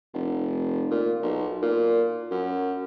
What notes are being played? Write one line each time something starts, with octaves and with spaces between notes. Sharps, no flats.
F1
A#2
B1
A#2
F#2